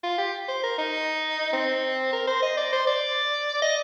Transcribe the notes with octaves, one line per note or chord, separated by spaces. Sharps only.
F4
G4
C5
A#4
D#4
C4
A#4
C5
D#5
D5
C5
D5
D#5